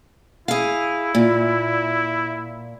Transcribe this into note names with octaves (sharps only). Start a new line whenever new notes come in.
E4 G#4 F5
A#2